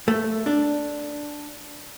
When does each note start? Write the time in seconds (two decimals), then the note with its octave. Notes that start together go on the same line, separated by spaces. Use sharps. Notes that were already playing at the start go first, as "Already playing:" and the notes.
0.08 A3
0.46 D4